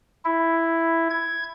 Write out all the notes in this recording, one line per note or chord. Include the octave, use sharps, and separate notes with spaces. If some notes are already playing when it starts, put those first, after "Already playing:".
E4
G#6